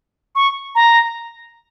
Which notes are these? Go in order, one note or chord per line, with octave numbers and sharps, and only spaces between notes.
C#6
A#5